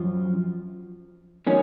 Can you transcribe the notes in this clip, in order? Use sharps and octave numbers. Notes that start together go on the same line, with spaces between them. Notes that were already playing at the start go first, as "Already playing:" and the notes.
Already playing: F#2 F3
D#3 F#3 C#4